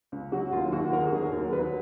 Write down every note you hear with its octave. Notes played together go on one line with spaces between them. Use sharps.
C#2
F#3 F#4
D#2 F4
F4
D#2 F#4
D#3 A#4
G#4
F#4
F#3 G#4
A#4
D#2
F#3 B4